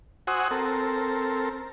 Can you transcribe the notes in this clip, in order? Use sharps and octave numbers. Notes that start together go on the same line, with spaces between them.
F#4 C5 F#5 G#5 D#6 E6
C4 A4 A#4